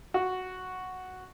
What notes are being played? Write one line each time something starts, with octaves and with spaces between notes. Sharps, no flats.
F#4